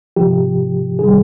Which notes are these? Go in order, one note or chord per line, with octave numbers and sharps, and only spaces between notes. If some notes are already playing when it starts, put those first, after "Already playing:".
C3 F3 G4
C3 D#3 G3 G#4